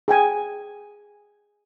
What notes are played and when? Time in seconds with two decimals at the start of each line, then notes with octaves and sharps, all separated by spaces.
0.08 G#4 G5 G#5